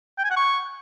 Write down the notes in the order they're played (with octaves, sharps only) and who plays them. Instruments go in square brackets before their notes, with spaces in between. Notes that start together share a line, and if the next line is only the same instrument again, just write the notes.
[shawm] G5
G#5
F#5
C#6